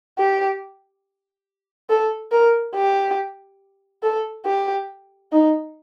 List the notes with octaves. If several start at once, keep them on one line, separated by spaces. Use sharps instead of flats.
G4
A4
A#4
G4
A4
G4
D#4